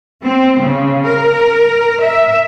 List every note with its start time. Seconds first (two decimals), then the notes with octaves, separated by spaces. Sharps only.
0.23 C4
0.59 C#3
1.05 A#4
2.00 E5